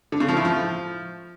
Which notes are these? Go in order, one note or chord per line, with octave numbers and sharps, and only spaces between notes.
D3
C#3
F3
A2
F3